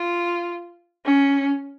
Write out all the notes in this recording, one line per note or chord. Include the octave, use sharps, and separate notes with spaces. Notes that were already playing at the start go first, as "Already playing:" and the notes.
Already playing: F4
C#4